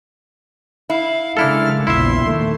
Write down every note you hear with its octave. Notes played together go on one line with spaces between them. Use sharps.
E4 F5
C#3 G#3 A#3 D4 E4 A4 F6
A#1 E2 E4 E5 C6
D#3 A3